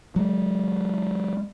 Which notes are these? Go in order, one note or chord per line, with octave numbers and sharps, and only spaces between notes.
F#3 G#3